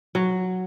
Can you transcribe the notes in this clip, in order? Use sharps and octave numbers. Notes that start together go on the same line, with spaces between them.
F#3